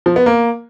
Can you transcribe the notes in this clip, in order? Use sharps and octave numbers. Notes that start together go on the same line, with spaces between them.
F3
B3
A#3